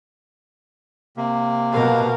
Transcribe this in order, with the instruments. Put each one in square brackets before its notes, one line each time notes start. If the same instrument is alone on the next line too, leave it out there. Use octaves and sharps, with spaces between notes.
[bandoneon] C3 A#3
[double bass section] B2 [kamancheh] A#4 F5